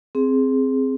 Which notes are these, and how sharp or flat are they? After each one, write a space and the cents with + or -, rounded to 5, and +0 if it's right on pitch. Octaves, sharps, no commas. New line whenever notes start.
C4 +0 G#4 +5